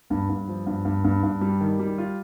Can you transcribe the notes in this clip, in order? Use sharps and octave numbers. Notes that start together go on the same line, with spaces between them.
G2
G2
F3
G2
G2
G2
G2
G3
D#3
G3
F4